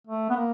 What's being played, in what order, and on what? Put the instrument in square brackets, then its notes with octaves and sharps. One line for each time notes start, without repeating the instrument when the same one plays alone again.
[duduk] A3
B3
A#3